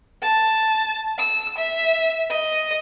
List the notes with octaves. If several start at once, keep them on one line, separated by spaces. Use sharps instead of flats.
A5
E6
E5
D#5